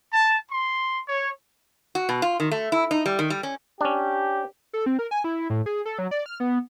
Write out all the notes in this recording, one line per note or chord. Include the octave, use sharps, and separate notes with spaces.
A5
C6
C#5
F#4
B2
F4
D#3
A3
E4
D#4
G3
D#3
G3
C#4
C#4 D4 G4
A4
C4
A#4
G#5
E4
A2
G#4
A4
F#3
D5
F6
B3